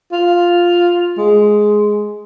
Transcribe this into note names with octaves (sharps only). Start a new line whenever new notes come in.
F4
G#3